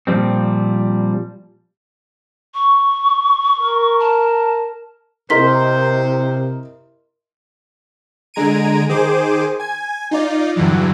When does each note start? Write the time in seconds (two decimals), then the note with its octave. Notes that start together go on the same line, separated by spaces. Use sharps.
0.07 A#2 F3 G3 C4
2.54 C#6
3.60 A#4
3.99 A5
5.30 C3 E4 A#4 C5 D#5 C6 B6
8.34 D3 G#3 A#5 G#6 D7 D#7
8.89 D#3 G#4 C5 D6 D#7
9.59 G#5 G#6
10.11 D#4 F4 D5
10.56 E2 G2 D3 E3 F#3